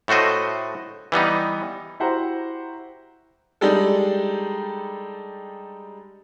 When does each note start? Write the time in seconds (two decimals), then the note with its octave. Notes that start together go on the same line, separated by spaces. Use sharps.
0.08 A2 A3 F#4 C5 D#5
1.12 E3 G3 B3 D#4
2.00 E4 F#4 G4 C5 F#5 A#5
3.61 G3 G#3 D4 D#4 G4 A4